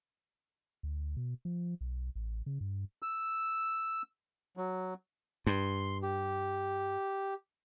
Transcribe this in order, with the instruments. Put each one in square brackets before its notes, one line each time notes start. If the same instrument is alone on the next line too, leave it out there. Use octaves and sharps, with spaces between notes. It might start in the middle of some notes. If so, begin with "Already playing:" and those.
[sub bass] D2
B2
F3
B1
A1
C#3
G2
[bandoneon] E6
F#3
[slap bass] G2 [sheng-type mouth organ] C6
[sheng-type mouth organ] G4